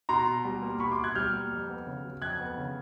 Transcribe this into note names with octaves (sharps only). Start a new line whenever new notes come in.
B2 A#5 C6
B2
G3
A#3
B2 B5 C#6
C6 D6
B2
F#6 G#6
G3 F6 G6
A#3
F2
B3
C#3
F#3
F2 F#6 G#6
B3
C#3